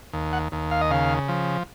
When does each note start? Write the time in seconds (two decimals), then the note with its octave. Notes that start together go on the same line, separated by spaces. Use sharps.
0.13 D#2
0.33 F#5
0.52 D#2
0.71 F5
0.81 D#5
0.91 C#3 F5
1.29 F3